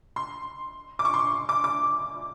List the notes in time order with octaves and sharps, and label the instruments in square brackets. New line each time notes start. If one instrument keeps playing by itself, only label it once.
[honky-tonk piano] C6
D6
C#6
C6
C#6
D6
D6